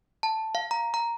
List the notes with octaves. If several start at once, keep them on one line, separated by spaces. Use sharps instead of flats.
A5
F5
A#5
A#5